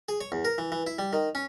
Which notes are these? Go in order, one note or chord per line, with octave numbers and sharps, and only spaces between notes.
G#4
C#5
E2
A#4
E3
E3
E4
G3
D#3
C#4